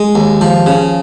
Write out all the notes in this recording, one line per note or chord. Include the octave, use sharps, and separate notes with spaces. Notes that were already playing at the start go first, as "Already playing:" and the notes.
Already playing: G#3
D#2
F3
C#3